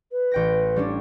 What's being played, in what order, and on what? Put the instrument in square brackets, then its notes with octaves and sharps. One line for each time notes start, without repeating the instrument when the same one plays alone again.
[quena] B4
[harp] A1 G5 A#6
G3 C#4 D4